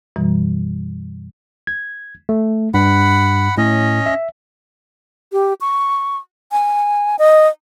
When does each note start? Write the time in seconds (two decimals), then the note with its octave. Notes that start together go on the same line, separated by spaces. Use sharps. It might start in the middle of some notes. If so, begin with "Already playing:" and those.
0.16 F#2 B2 E3 G3
1.67 G#6
2.29 A3
2.74 G2 F#5 B5
3.58 A2 C#4 D#5
4.06 E5
5.32 G4
5.61 C#6
6.52 G#5
7.19 D#5